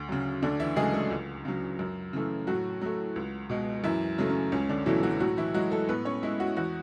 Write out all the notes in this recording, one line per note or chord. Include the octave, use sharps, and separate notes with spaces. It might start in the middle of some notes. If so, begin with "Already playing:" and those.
Already playing: D2
C#3 F#3
D2 D3 D4
E3 E4
C#3 F#3 G#3 A3 G#4
A3 A4
C#2
C#3 F#3
F#2
C#3 E3 A3
A2 F#3 F#4
F#3 A3
C#2
B2 G#3
F#2 E3 E4
C#3 F#3 A3
C#4
C#2 C#4
D3 D4
B2 E3 F#3 A3 E4
F#3 F#4
A2 F#3 F#4
E3 E4
F#3 G#3 F#4
A3 A4
A2 B3 B4
C#4 C#5
G#3 E4 E5
F#4 F#5
E2 F#4 F#5